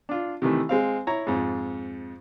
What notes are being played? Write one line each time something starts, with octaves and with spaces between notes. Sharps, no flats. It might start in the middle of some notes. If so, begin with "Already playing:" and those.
D4 F4
C3 D#3 E3 A3
G#3 C4 F5
E4 C#5 A#5
F2 G#2